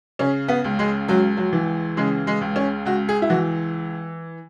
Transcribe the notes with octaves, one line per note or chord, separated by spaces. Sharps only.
C#3 C#4
B3
C#2
G#3
C#2 F#3
F#3
E3
C#3 G#3
G#3
C#2
C#4
C#2 F#4
G#4
E4
E3 F#4